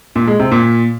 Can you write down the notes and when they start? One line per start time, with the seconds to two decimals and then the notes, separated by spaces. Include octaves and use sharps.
0.16 A#2
0.28 G#3
0.39 C3
0.51 A#2